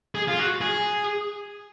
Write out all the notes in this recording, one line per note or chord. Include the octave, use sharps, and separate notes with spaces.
G#4
F4
F#4
G#4